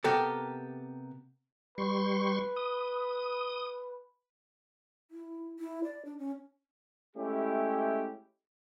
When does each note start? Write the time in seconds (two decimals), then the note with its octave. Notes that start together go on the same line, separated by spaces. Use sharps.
0.04 C3 B3 G4 A4 A#4
1.78 G3 B4 C6 C#6
2.56 D#6
5.11 E4
5.59 E4
5.84 D5
6.05 D4
6.18 C#4
7.16 G#3 A3 C#4 E4 G4